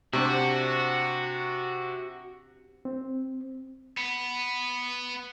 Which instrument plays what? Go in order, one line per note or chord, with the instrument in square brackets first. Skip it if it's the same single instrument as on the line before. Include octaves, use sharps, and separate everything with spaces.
[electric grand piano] C3 [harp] C4 D4 G4 [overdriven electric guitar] F#4
[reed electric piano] C4
[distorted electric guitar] B3